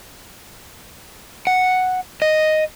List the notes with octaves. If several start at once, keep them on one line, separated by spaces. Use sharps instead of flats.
F#5
D#5